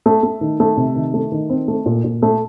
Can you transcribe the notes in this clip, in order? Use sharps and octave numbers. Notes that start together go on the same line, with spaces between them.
A3
A3
D#3
A3
C3
D#3
A3
D#3
C4
A3
A#2
A#2
A3